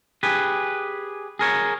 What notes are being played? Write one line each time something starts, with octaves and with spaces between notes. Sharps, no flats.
G4 G#4 B4
G#4 A#4 C#5